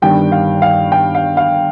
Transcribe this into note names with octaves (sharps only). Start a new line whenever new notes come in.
G1 G2 D#3 G3 G5
F5
F5
G5
F5
F5